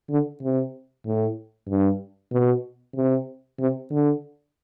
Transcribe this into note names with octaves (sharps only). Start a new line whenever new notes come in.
D3
C3
A2
G2
B2
C3
C3
D3